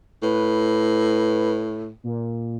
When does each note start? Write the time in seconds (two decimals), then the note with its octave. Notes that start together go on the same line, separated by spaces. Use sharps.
0.23 A2 B4
2.03 A#2